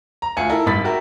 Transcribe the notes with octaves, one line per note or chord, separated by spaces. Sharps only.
A#5
D2 F4 G#5 C#7
D#4 E4 A4 A#4
G#1 G2 B5 A6 B6
F#4 G4 A#4 E5